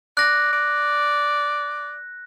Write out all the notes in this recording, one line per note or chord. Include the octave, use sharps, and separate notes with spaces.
D5 F#6 A#6
D5